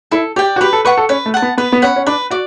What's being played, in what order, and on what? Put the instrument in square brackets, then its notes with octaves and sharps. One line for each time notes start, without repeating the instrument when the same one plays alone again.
[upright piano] E4 [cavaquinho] A4
[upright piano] G4 [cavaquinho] D5 G5
[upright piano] F#4
[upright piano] G4 [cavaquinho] B4
[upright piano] A4
[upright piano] B4 [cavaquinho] F#5 C#6
[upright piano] A4
[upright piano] C#4 [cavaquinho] B4
[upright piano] A3
[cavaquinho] F#5 A5
[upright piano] B3
[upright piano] B3 [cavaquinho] B4
[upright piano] B3
[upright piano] C#4 [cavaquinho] F#5 B5
[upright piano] C#4
[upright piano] D4 [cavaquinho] B4
[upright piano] F#4 [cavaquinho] D5